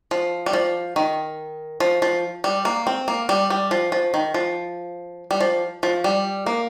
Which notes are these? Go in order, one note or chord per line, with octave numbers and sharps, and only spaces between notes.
F3
G3
F3
D#3
F3
F3
G3
A#3
C4
A#3
G3
G3
F3
F3
D#3
F3
G3
F3
F3
G3
A#3